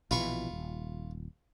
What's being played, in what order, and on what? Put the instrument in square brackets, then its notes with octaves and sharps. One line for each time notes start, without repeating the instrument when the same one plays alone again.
[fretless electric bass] A#1 B2 E3 [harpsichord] F4 B5 C#6
[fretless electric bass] D#1